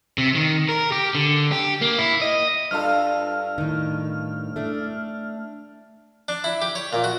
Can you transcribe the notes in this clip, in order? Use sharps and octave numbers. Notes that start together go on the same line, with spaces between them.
C3
D#3
A#4
G4
D3
G4
A#3
E4
D#5
G2 F4 A4 F6
A2 D#3
A3 D4
D4
E4
G4
C#5
A#2
F#4